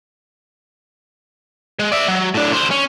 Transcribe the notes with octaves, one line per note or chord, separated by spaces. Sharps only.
G#3
D5 E5
F#3
A2 D4
D3 C5
C#4